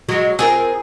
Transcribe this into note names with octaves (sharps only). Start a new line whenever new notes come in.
F#3 G#3 F#4
C4 F4 G#4 A#4